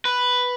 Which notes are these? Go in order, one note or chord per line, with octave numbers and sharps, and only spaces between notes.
B4